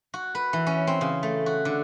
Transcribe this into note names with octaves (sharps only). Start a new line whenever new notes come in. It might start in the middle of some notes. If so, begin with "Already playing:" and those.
F#4
B4
E3
C#4
C4
C#3
A3
F#4
D3